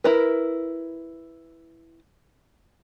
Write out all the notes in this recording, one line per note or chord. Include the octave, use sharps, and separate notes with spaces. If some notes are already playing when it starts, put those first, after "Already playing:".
E4 A#4 B4